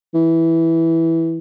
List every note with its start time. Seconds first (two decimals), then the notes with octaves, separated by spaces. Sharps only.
0.15 E3